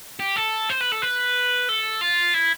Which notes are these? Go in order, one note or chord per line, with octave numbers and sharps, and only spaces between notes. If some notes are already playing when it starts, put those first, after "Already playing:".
G4
A4
C5
B4
A4
B4
A4
F4
E4